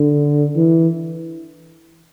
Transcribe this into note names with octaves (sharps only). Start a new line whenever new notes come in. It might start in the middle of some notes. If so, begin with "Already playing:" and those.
Already playing: D3
E3